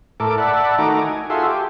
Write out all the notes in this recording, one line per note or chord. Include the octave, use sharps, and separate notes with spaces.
A2 A4 A#4 D6
D5 E5 F#5 A5 B5
D#3 A3 D#4 F#4 A#5 D6
G#5
F4 F#4 G#4 A4 E5 C6
G4